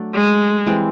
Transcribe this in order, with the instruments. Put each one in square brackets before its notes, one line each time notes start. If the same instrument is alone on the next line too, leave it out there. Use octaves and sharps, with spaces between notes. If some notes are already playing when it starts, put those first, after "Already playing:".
Already playing: [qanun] F#3 A3 D4
[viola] G#3
[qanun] E3 G3 C4